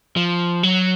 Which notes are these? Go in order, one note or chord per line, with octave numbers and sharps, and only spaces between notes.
F3
F#3